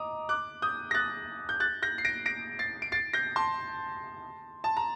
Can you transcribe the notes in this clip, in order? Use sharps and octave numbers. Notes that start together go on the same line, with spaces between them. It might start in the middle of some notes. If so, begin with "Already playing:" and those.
Already playing: D#5 A#5 D6 D#6
D6 F#6
D#6 G6
A#6
F#6 A6
G6
F#6 A6
G6 A#6
C7
A#6 D7
A#6 D7
A6 C7
D7
A6 C7
G6 A#6
A5 C6
A5
A#5